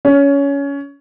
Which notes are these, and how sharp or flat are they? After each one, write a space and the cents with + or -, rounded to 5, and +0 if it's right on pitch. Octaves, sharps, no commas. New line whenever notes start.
C#4 +20